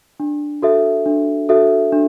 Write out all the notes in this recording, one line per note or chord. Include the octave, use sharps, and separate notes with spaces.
D4
F#4 A4 E5
D4
F#4 A4 E5
D4